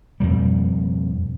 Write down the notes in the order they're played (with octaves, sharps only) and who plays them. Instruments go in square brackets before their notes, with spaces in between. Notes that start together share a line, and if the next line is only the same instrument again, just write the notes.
[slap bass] F2 B2 G3